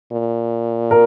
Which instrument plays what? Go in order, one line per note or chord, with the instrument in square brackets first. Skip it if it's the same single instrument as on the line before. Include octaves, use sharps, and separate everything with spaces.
[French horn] A#2
[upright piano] A#4